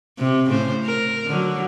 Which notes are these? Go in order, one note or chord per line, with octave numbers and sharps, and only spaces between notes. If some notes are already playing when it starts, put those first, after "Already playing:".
C3
A2 C#3 C5
A#4
D3 F#3